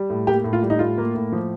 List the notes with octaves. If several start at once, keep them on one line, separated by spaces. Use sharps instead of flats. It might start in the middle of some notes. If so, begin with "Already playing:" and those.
Already playing: G3
A2
A#3 G4
A2
F4
G3
D#4
A2 F4
A#3
A2
F3